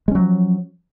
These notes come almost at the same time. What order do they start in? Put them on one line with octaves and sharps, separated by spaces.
G#3 C#4 F#3 F3